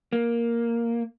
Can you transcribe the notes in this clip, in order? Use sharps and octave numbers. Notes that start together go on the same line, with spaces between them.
A#3